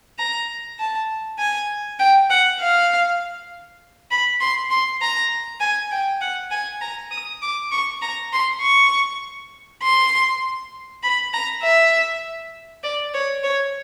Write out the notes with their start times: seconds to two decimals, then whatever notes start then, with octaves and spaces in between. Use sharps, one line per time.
0.19 A#5
0.79 A5
1.39 G#5
1.99 G5
2.30 F#5
2.60 F5
4.11 B5
4.40 C6
4.70 C6
5.01 A#5
5.61 G#5
5.91 G5
6.21 F#5
6.51 G#5
6.81 A#5
7.11 D#6
7.42 D6
7.72 C#6
8.02 A#5
8.33 C6
8.62 C#6
9.83 C6
11.03 B5
11.33 A#5
11.63 E5
12.83 D5
13.14 C#5
13.43 C#5